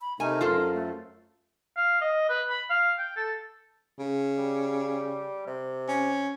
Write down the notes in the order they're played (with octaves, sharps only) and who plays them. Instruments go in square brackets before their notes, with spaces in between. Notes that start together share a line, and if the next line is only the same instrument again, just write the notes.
[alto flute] B5
[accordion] C3 A3 D#4 [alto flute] A#4 [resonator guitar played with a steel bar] G#5
[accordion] F#2 [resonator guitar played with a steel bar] F4 A4 C5
[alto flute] A3
[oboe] F5
D#5
B4
B5
F5
G5
A4
[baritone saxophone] C#3
[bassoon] G3
C3
[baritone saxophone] C#4